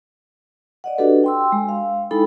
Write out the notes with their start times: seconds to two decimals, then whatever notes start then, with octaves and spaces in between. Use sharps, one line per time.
0.84 D5 D#5 F#5
0.98 D4 F#4 G4 A4 B4
1.24 G5 C6 E6
1.52 G#3
1.69 F5
2.11 G#3 D#4 E4 A4 G5 B5